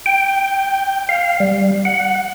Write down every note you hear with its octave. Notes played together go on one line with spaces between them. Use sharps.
G5
F5
G3
F#5